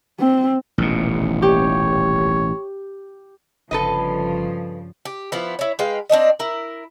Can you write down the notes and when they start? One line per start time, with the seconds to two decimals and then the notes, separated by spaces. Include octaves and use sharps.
0.20 C4
0.78 D#1 A1 B2
1.42 G4 C#5
3.71 G1 G2 C#3 F3 A4 B4 D#5
5.05 G4
5.32 F3 B3 E4
5.59 E4 C#5
5.79 G#3 B4 F5 G5
6.09 C4 D4 D#4 D#5
6.39 E4 A#4